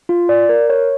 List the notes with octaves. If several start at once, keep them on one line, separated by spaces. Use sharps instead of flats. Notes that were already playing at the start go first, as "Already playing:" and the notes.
F4
D5
A#4
C#5